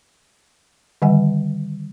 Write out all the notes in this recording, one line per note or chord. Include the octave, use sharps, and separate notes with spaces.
D3 D#3 G3 D#5 F#5 G#5